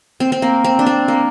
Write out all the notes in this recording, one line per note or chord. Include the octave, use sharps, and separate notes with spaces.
C4
C4
A#3
C4
D4
C4
A#3